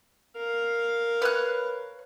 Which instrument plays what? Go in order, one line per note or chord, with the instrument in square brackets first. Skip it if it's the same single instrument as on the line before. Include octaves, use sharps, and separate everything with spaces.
[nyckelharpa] A#4 F5
[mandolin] B4 C#5 F#6